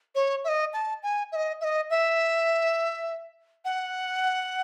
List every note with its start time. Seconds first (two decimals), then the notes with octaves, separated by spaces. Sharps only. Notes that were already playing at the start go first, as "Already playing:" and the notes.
0.15 C#5
0.44 E5
0.48 D#5
0.73 A5
1.03 G#5
1.32 E5
1.36 D#5
1.61 E5
1.64 D#5
1.90 E5
3.65 F#5